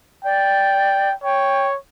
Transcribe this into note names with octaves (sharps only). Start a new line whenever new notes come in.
D5 G5
C#5 G5